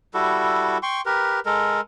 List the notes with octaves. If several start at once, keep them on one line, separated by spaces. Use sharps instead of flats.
G3 E4 F#4 A4
G5 C6 C#6
G4 A#4 B4
G#3 A4 A#4